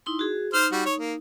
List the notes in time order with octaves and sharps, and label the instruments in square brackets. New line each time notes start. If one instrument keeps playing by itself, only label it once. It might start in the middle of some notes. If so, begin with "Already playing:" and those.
[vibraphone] D#4 E4 C6
F#4 G#4
[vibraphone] D#4 [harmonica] C5 F6
[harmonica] G3 F#4
C#5
A#3